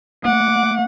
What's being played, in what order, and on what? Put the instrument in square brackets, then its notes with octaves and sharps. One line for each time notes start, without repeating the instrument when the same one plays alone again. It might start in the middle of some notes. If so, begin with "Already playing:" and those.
[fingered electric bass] A3 A#3 [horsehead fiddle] F#5 [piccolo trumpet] D6